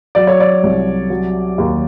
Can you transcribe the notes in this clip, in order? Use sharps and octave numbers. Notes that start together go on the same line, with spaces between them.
F#3 D5
C#5
D5
C2
F#3
D#2